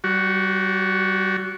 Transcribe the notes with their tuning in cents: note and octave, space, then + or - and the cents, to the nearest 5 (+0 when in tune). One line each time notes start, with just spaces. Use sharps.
G3 -30 F#4 +0